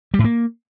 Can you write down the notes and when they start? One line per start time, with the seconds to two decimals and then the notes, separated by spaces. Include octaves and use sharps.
0.14 G3
0.19 A2
0.24 A#3